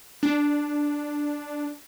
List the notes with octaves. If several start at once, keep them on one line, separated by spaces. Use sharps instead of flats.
D4